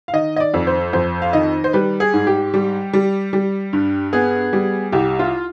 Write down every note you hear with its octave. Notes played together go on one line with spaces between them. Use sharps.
F5
D#3 D#5
D#5
D5
F2
C5
F2 C5
F5
D#3 D#5
C5
G3 B4
G#4
G#2
G4
G3
G3
G3
G2
B3 G#4
G3
C2 G4
F4